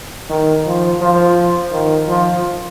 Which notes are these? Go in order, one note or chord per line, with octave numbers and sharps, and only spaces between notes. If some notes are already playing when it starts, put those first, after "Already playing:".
D#3
F3
F3
D#3
F3